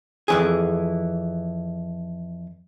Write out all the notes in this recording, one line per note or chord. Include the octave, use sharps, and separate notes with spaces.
F2 E3 G#4